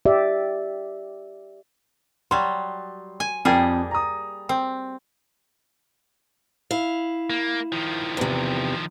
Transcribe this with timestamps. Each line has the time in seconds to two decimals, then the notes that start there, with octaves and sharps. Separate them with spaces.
0.05 G4 D5 E5
2.31 F#3 G3 C6
3.20 G#5
3.45 F2 G3 A#3 G#4 G5
3.91 A#5 D#6
4.49 C4
6.71 E4 F5
7.30 A#3
7.72 D#3 F3
8.17 E2 C3